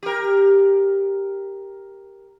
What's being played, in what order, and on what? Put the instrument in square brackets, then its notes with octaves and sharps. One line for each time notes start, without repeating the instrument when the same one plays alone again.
[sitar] G4 A#4